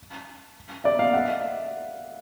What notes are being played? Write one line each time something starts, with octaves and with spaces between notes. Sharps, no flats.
D5 E5
D#5 F5
E5 F#5